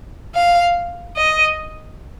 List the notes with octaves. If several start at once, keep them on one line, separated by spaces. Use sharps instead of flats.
F5
D#5